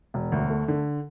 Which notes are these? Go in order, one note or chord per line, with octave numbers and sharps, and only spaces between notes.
E1
D2
A3
D3